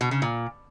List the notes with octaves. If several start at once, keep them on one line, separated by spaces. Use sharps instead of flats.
B2
C#3
A#2